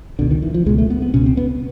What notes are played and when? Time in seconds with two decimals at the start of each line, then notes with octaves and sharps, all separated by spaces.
0.19 C#2 B2 D3
0.31 D#3
0.42 E3
0.54 F3
0.66 C#2 B2 G#3
0.78 A3
0.90 B3
1.02 B3
1.14 C#2 B2 C#4
1.26 C4
1.37 B3